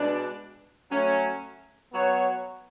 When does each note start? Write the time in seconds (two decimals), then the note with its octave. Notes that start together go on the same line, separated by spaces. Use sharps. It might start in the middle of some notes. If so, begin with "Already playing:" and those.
Already playing: B2 G#3 D4
0.91 F#3 A3 C#4
1.92 F#3 B3 F#4 C#5